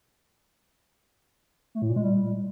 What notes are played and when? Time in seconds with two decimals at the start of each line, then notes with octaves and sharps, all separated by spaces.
1.75 A3
1.82 A2
1.89 A#2
1.96 G#3
2.03 G3